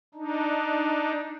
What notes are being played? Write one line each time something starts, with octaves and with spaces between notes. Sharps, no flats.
D4 D#4